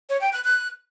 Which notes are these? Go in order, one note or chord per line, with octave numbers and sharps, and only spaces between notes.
C#5
G5
F#6
F#6